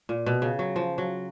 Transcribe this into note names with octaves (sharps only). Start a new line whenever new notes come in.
A#2
B2
C#3
F#3
F3
F#3